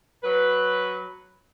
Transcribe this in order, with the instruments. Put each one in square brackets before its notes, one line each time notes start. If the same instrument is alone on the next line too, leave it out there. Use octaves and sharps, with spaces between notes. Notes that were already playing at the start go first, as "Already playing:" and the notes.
[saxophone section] F#3 B4